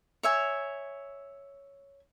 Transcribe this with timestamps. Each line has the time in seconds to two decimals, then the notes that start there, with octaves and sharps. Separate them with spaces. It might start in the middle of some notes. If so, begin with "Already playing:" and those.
0.23 C#5 E5 G#5